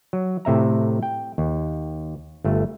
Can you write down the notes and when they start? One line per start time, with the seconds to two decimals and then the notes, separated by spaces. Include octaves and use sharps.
0.13 F#3
0.45 A2 C3 E5 A#5
1.03 G5
1.38 D#2
2.44 G1 A3